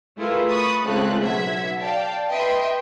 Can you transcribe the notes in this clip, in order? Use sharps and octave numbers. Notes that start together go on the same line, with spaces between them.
A3 E4 F4 G#4 A#4 B4
B5 C#6 D#6 F#6 A6
C#2 C#3 A3 C4 F4 F#6
B1 E5 F#5 G#6 B6
D5 F5 G5 A5
B4 D#5 E5 G5 C6